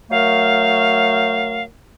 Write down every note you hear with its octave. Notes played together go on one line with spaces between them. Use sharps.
F#3 A3 A#4 F5